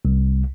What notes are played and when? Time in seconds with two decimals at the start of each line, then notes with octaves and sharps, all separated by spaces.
0.05 C2